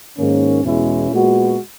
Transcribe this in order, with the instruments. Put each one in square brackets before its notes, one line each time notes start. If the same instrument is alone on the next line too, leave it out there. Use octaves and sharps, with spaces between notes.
[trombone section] G#2 D#3 A#3 C#4
E2 B2 G#3 C#4 E4
A#2 G#3 B3 F#4